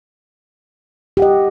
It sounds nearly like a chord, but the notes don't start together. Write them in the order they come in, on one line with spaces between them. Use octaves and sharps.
G4 F#5 D#5